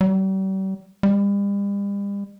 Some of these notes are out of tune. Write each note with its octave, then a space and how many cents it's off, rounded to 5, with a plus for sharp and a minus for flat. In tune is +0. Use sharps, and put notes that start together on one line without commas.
G3 -40
G3 +40